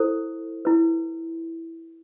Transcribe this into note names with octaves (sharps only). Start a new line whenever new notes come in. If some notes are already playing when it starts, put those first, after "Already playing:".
Already playing: E4 A4 C5
E4 B4